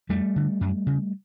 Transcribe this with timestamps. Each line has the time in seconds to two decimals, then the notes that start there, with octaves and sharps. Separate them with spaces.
0.09 F2 G3 A3
0.36 D3
0.61 F#2
0.87 C#3